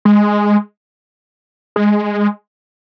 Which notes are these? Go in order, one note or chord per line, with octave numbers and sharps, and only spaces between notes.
G#3
G#3